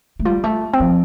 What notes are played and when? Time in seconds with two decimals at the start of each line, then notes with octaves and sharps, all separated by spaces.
0.19 A3
0.25 G3 F4
0.44 A3
0.73 C4
0.80 F3